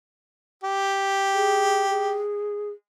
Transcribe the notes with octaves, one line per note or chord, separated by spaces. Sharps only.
G4
G#4
G#4